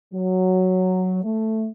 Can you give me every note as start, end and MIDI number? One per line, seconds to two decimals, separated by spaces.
0.14 1.22 54
1.24 1.68 57